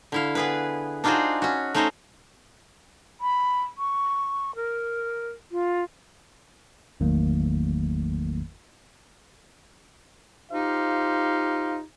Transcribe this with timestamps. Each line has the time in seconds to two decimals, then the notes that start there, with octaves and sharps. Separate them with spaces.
0.12 D3 E4 F5
0.35 B3 G#4 B4
1.04 D4 D#4 F4 F#4 G#4 C5
1.42 C#4 F#4
1.74 A3 C#4 D#4 C5 C#5 D#5
3.21 B5
3.78 C#6
4.56 A#4
5.51 F4
7.00 G#1 E2 D#3 F#3 A3 A#3
10.52 D#4 F4 G4 C5 F5